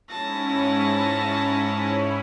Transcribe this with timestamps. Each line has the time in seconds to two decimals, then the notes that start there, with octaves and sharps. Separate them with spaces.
0.10 G#2 C#4 E4 A5 A#6